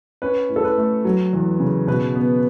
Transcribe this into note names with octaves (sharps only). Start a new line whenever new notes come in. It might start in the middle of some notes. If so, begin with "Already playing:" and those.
C#4 B4
A2
A4
B4
A3
F#3
E2
C#3
B2 B4
B3